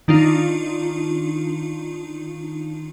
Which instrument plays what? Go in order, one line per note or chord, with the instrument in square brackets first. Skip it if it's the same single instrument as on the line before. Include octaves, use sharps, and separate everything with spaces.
[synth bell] D#3 D4 D#4 F4